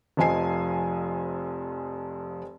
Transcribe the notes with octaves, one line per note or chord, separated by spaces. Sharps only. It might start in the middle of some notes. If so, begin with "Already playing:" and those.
F1 F2 F3 D#5 G#5 C7